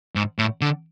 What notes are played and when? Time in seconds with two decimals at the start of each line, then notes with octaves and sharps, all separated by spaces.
0.16 G#2
0.39 A2
0.61 D3